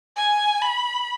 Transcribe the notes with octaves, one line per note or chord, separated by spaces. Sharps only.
G#5
B5